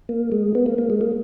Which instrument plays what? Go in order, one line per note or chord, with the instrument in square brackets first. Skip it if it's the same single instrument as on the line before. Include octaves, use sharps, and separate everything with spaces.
[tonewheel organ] A#3
G#3
B3
A#3
A#3
G#3
A#3